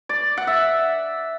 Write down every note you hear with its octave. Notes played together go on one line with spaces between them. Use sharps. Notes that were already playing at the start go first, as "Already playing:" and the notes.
D5
F#5
E5